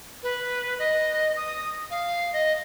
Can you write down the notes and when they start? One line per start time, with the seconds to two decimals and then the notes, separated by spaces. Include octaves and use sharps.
0.23 B4
0.79 D#5
1.36 D#6
1.91 F5
2.33 D#5